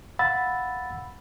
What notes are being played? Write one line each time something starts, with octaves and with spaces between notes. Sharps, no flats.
F5 F#5 B5 E6 A6